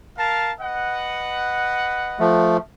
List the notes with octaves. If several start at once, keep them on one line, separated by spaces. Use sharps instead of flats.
A#4 F5 A5
B4 D#5 F#5
F3 A3